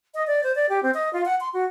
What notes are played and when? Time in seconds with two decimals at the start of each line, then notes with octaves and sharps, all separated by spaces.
0.15 D#5
0.27 D5
0.43 C5
0.55 D5
0.69 G4
0.83 C4
0.94 D#5
1.13 F4
1.26 F#5
1.41 C6
1.53 F#4